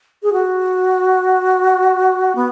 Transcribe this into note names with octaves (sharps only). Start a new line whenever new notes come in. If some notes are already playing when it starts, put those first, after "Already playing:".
G#4
F#4
B3